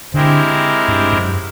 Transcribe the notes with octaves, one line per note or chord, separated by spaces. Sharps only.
D3 G#3 C4 E4 G4 A#4
G2
F#2